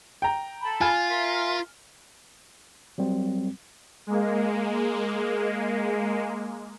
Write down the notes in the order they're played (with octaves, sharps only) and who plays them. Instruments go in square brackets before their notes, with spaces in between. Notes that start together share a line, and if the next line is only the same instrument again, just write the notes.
[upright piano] G5 A#5
[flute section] A4 A5 B5
[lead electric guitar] F4 [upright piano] G#5 F6
[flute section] A#4 E5 C6
[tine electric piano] F#3 G3 C4
[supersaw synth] G#3 A#3